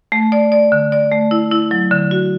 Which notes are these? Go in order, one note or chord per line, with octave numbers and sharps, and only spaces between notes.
A3
D5
D5
D3
D5
A3
E4
E4
F#3
D3
F#4